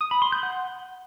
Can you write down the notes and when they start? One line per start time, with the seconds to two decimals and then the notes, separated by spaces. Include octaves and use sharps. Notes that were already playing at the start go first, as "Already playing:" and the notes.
0.01 D#6
0.11 B5
0.22 C6
0.32 G6
0.43 F#5